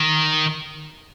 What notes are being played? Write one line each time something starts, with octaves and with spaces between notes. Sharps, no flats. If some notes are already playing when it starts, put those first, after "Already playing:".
Already playing: D#3